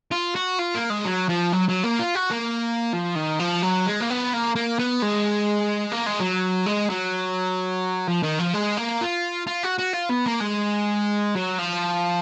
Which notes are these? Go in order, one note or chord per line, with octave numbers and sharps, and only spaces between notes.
F4
F#4
F4
A#3
G#3
F#3
F3
F#3
F#3
A#3
F4
F#4
A#3
F3
D#3
F3
F#3
G#3
A#3
B3
A#3
A#3
B3
G#3
A#3
G#3
F#3
G#3
F#3
F3
D#3
F3
G#3
A#3
F4
F4
F#4
F#4
F4
B3
A#3
G#3
F#3
F3